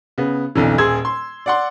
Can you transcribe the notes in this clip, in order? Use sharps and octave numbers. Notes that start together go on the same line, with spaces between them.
C#3 B3
B1 F2 D3 E3
D#1 G#4 C6 E6 G#6
C6
D5 F#5 C6